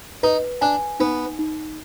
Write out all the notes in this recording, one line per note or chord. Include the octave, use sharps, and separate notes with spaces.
D#4 B4
D4 G#5
B3 D#4
D#4